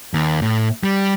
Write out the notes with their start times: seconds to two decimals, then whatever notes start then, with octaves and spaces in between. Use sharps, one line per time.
0.14 D#2
0.42 A2
0.84 G3